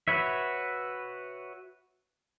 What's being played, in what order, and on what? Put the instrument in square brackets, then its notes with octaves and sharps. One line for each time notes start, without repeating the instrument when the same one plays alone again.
[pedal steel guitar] F#4 B4 C#5 E5